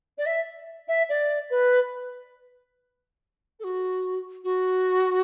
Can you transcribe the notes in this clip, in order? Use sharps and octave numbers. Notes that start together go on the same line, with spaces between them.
D5
E5
E5
D5
B4
A4
F#4
F#4